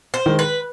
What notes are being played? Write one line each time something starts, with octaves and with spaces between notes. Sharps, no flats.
C5
D#3 G#3
B4